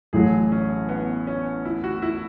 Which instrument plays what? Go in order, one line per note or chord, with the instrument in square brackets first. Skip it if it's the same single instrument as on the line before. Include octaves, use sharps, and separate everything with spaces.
[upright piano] A1 A2 F#3 [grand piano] G#4
[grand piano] C#4
B3
C#4
E4
F#4
E4